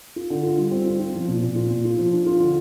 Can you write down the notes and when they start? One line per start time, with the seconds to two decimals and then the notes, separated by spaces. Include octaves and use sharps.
0.16 F4
0.30 D3
0.43 F4
0.58 G3
0.71 C4
0.86 F4
1.00 F4
1.14 F3
1.28 A#2
1.43 A#2
1.56 F4
1.70 A#2
1.85 F4
1.98 F3
2.13 D4
2.26 F4
2.40 D3